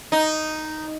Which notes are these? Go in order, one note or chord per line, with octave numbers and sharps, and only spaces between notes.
D#4